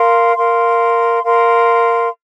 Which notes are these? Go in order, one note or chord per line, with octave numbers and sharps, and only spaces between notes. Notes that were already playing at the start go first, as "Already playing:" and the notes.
Already playing: A#4 F5 C6
A#4 F5 C6
A#4 F5 C6